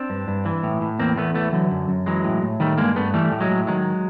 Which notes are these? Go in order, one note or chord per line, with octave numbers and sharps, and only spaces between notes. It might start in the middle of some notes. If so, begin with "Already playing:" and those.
Already playing: C4 D4
G2
G2
E3
A2
A2
E2 A#3 C4
E2 A3 B3
E3 A3 B3
D3 E3 F#3
F#2
F#2
E3 F#3 G#3
A2
A2
D#3 G3 A3
G2 G#3 A#3
G2 A3 B3
E3 G3 A3
A2
F#3 G#3
A2
D#3 F#3 G#3